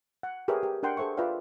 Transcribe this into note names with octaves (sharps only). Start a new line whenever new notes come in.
F#5
G4 G#4 A#4 B4 C#5 E5
G4
D4 A#4 F#5 G5 C6
G#4 A4 C5 E5 C#6
F4 B4 D5 E5 F5 G5